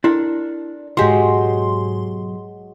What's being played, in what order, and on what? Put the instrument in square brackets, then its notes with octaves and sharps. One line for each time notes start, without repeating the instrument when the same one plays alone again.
[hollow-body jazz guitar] D4 A4 A#4 [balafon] E4
[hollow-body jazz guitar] B1 G4 [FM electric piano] G#2 C6 [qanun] F#3 G#3